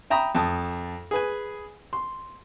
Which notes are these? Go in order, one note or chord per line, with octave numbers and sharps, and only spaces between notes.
E5 G5 A#5 B5 D#6
F2 A5 D#6
G#4 B4 G#5
C6